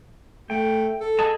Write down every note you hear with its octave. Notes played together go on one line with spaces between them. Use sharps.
A3 G5
A4
G#4 D#5 A5